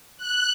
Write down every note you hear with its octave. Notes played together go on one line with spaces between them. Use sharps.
F#6